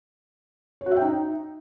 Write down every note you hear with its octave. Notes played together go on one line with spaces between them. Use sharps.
C#5
F#4
E5
G5
D#4